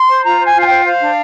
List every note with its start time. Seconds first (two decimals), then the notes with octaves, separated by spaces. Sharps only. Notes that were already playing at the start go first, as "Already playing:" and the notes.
Already playing: C6
0.10 C5
0.24 F4 A#5
0.41 C5 G#5
0.55 F4
0.61 G#5
0.66 C5 G5
0.85 C5 F5
1.01 D4